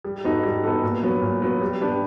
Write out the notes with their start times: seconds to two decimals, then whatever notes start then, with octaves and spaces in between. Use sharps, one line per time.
0.04 G3
0.24 B3 D#4 F#4 A4
0.43 G3
0.63 B3 D#4 F#4 A4
0.83 A#2
1.03 F#3 B3
1.22 A#2
1.42 F#3 B3
1.62 G3
1.81 B3 D4 G4